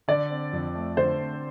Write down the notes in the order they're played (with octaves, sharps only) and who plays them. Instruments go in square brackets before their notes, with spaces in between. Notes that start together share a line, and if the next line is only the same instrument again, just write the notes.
[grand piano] D3 [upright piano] D5
[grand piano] C4
F2
A3
[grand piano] D3 [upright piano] C5
[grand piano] C4